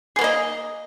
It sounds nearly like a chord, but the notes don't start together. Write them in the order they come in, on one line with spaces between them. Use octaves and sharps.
G#4 B3 A#3 D#5